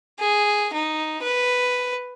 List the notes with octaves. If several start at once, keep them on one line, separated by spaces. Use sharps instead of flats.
G#4
D#4
B4